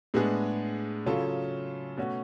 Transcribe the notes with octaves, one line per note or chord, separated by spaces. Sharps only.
A2 G#3 B3 D4 G#4
C#3 F#3 C#4 F4 A4
B2 A3 C#4 F#4